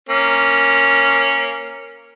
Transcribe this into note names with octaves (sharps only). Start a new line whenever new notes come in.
A#3 C#4